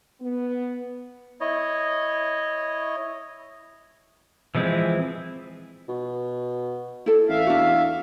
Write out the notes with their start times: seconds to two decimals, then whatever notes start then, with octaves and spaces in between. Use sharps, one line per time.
0.21 B3
1.41 E4 C#5 D#5
4.55 E3 F3 G#3 C4 E4
5.88 B2
7.06 E4 A4
7.29 A1 E5 F5
7.47 E2 D4 F#4